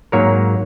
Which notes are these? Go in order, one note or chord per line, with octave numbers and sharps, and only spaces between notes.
G#2 F#3 A#3 A#4 C#5